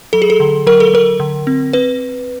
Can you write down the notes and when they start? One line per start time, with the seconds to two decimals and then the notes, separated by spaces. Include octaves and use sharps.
0.13 F#3 A4
0.22 G#4
0.30 A4
0.40 D3
0.67 F#3 A#4
0.80 A4
0.94 F#3 A#4
1.20 D3
1.47 C4
1.73 C4 B4